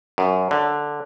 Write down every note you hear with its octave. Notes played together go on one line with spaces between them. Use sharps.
F#2
D3